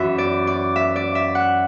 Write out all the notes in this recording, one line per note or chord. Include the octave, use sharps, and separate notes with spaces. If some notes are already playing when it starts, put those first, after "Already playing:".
Already playing: F#2 E3 E5
D5
D5
E5
D5
E5
F#5